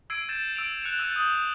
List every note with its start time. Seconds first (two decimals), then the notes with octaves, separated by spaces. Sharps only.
0.10 E6 G#6 C7 D7 D#7
0.29 G6 A6 E7
0.56 E6 D7 F7
0.82 F#6 C#7 E7 F7
0.99 E6 G6 A6 D#7
1.16 D#6 E6 G6 F7